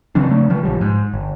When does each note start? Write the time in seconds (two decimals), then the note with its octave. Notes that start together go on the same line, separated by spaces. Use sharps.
0.15 C#3 F3 C4 D4
0.29 C#3 A3
0.50 C#3 F3
0.63 A#1 F3 G3
0.81 G#2
1.14 G1